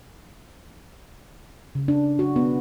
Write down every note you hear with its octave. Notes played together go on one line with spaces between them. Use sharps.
C#3
D4
F#4
B3